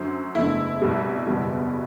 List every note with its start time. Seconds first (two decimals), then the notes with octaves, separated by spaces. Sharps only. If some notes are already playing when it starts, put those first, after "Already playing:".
Already playing: F#2 D3 F#3 C5
0.35 F#1 E2 D3 A3 E4
0.82 C2 B2 G3
1.27 F#1 E2 B2 G3